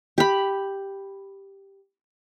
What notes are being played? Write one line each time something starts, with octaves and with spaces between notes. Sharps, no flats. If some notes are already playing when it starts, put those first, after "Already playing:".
G4 B5